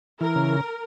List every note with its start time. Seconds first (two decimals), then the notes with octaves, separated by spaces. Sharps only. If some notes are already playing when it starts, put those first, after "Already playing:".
0.21 E3 A#4
0.36 C#3